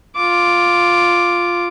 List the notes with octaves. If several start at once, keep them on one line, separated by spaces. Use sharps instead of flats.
F4 D6